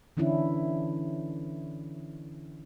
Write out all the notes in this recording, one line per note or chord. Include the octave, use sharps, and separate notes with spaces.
D3 E3 C#4 D4 E4